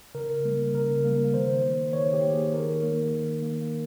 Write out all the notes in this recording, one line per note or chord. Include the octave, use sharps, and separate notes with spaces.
C#3 A#4
G3 A#3
C#3 A#4
G3 A#3
D#3 C5
A#3
D#3 C#5
G4
A#3
G#4
D#3 A#4
A#3
D#3
A#3